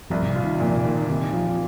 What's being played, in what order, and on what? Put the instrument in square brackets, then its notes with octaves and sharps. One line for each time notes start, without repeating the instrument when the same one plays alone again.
[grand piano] C2 [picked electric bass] F3
[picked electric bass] A#2
C3
[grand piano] F4
[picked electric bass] D#3
[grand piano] A#2 [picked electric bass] F3
[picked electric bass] C3
[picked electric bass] D#3 [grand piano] A#3
[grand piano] C3 [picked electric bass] D#3
[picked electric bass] F3 [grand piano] F4
[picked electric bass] F3